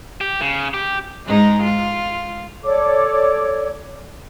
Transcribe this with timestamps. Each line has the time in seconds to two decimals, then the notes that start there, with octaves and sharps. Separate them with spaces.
0.21 G4
0.41 C#3
0.74 G4
1.25 G#2 G#3 D#4
1.62 F4
2.64 A4 C#5 D5 D6